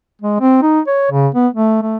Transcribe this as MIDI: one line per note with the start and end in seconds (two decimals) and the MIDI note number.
0.21 0.37 56
0.40 0.59 60
0.62 0.80 63
0.87 1.11 73
1.12 1.28 49
1.34 1.48 59
1.54 1.80 57
1.82 1.98 57